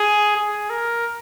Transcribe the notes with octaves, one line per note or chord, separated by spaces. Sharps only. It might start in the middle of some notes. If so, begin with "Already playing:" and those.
Already playing: G#4
G#4
A#4